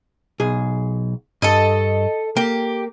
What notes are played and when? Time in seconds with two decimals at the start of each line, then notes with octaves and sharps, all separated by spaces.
0.40 B1 G#4
1.42 G2 A4 D#5
2.37 A#3 G4